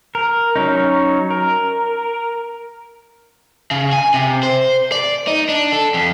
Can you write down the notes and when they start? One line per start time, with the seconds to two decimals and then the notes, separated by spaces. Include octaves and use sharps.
0.15 A#4
0.56 F#3 C#4 D#4
1.30 A#4
3.71 C#3
3.93 G#5
4.14 C3
4.43 C5
4.92 D5
5.27 D#4
5.49 D4
5.72 A4
5.94 F2